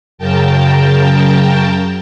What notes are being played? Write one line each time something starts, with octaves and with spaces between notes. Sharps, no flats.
F#2 C#3 A#4 G5 A5